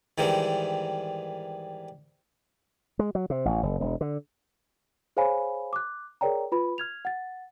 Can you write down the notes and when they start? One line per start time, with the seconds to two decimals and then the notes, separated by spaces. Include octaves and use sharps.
0.18 G#2 D#3 E3 G3
2.99 G#3
3.15 F#3
3.30 C3
3.45 A1
3.63 F#1
3.81 E1
4.01 D3
5.17 G#4 C5 C#5 F5 G#5 B5
5.73 D6 F#6
6.21 G#4 A#4 C#5 D5 G5 A#5
6.52 F4 B4 B5
6.78 F6 G#6 F7
7.05 F#5 A6